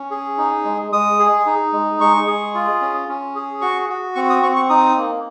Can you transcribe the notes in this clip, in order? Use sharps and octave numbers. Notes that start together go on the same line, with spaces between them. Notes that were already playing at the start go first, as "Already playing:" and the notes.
Already playing: C#4
G#4
D#4
G#3
G#3 D#6
G#4
D#4
G#3
G#3 C#6
G#4
F4
C#4
C#4
G#4
F#4 C#6
F#4
C4 C#6
D#6
C4 C#6
C#6
D#4 D#6
A#3